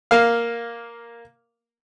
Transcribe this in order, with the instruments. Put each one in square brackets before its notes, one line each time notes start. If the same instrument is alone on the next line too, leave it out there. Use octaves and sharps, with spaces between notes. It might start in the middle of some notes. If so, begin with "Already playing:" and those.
[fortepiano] A#3 F5